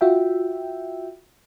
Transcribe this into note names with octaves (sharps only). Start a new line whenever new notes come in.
F4 F#4 E5 G5